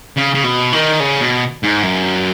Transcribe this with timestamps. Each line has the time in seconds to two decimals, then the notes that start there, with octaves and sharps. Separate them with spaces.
0.17 C#3
0.35 C#3
0.44 B2
0.73 D#3
1.00 C#3
1.21 B2
1.63 G#2
1.83 F#2